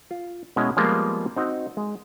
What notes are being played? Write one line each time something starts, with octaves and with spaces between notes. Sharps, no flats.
F4
B2 G#3 C#4 E4 D#5
F3 G3 G#3 A#3 B3 F4
C4 D#4 F#4
G#3